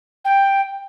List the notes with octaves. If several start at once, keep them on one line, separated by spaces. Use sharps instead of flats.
G5